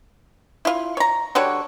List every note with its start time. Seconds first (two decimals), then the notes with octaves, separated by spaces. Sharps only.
0.65 E4 F4
0.97 C#5 A#5
1.35 D3 G3 F#4 C#5